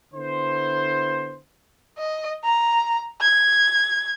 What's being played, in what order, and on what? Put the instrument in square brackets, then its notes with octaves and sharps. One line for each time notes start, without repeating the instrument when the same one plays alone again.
[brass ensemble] D3 B3 E4 C5
[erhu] D#5
A#5
G#6